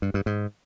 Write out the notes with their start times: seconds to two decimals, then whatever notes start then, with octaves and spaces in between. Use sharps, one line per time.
0.02 G2
0.14 G2
0.26 G#2